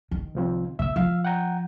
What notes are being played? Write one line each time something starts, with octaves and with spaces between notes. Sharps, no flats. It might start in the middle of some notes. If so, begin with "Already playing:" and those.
D#3
C2 F3 C4
C#3 E5 E6
F3 F5 E6
F#5 G5 A#5